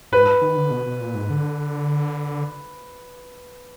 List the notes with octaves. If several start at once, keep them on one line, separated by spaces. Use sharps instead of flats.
G#2 B4
D#3
D3
B2
B2
A#2
G#2
D3